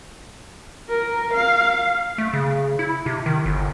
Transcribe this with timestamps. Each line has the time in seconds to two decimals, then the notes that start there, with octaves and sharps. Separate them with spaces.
0.90 A#4
1.33 F5
2.18 A3
2.33 C#3
2.79 E4
3.06 C3
3.26 D#3
3.46 G1